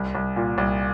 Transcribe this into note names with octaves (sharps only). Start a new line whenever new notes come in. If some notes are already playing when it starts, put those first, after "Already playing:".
Already playing: C2
C2
A#2
C2